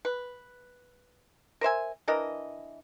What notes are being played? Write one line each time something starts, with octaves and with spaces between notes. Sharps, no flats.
B4
A#4 C5 E5 G#5
E3 D4 A#4 D#5